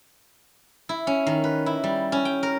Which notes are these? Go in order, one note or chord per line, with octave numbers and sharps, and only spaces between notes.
E4
C#4
D#3
B4
E4
G3
C#4
G5
A#4